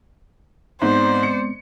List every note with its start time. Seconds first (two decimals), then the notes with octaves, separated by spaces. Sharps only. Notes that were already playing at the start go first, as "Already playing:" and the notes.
0.82 G#2 G#3 B3 C4 C5 D5
1.23 C#7